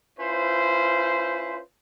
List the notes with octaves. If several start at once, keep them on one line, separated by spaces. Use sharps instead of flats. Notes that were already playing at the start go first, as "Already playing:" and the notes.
C#4 E4 F4 B4 C5